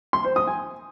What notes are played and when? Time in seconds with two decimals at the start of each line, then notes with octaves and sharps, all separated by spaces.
0.13 C6
0.25 C5
0.36 D#6
0.47 G#5